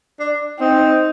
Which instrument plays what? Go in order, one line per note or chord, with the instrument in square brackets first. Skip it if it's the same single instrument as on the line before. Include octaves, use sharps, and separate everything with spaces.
[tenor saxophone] D4
[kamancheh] C4 [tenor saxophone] D#4